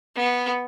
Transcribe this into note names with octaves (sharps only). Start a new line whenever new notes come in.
B3